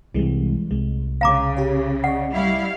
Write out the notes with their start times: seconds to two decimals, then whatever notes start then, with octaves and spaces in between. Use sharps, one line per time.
0.14 C2 C3 E3 G3 G#3
0.71 C2 G#3
1.21 C#3 F5 A#5 D6
1.57 G4 C#5
2.04 D5 D#5 F#5 C#6
2.33 G3 E4 F5